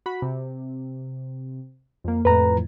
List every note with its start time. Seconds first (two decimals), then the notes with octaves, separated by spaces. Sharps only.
0.06 F#4 B5
0.22 C3
2.04 F2 A#3
2.25 F2 A2 B4 A#5